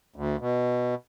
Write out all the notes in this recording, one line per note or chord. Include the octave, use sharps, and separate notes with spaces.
D2
B2